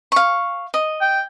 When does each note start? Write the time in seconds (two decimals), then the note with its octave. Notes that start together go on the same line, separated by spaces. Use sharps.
0.12 F5 C#6
0.74 D#5
1.01 G5